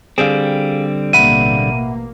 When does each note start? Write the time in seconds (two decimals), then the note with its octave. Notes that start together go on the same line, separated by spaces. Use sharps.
0.18 D3 G3 C4 G#4 F5
1.13 A1 B2 A#3 E5 F#5 B5 D#7